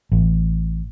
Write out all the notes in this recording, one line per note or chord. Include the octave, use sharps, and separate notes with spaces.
A1